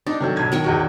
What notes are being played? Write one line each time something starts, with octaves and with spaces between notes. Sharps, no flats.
D4 D#4
D#3 F#3 A4
B1 G#6
D#3 A#4 C#5
A#1 E2 F#4